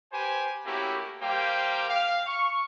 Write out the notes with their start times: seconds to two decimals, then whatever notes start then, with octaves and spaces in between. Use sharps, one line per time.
0.13 G4 B4 C5 G#5
0.65 A3 A#3 C#4 E4 F#4 G4
1.21 G3 A#3 G4 C5 F5 G5
1.89 F5
2.27 C#6